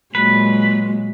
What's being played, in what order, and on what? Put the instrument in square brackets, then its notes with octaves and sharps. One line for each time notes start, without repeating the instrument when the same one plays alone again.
[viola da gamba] A#2 F#3 G#3 [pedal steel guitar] B4